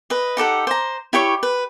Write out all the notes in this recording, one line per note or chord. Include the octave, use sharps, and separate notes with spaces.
B4 D#5
D#4 G4 A4 F#5
C5 A#5
E4 G4 C#5 C#6
B4